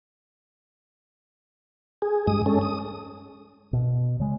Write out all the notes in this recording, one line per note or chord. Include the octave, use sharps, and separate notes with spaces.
G#4
G2 G#3 D#6
G#3 C#4 A4
D#6
B2
C#3 G#3